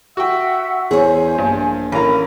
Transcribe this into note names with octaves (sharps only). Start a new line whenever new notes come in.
F#4 E5 F#5 G5 E6
E2 G#4 C5 C#5 G#5
A#1 G2
A1 C#4 A#4 F5 A#5 B5